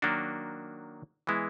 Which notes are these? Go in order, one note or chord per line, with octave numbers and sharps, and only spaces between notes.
D#3 F#3 A#3 D4 F#4
E3 G#3 B3 E4